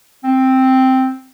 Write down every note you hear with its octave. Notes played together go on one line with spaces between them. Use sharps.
C4